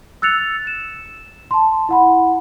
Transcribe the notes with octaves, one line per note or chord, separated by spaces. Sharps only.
E6 F#6 A6 C#7 F7
E7
A5 C6
E4 F#5 B5